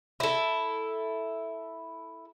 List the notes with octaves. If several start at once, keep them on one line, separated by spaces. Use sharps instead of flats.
E4 A4